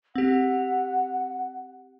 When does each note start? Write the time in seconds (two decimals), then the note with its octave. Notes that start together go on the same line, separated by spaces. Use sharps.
0.15 C4 G4 F#5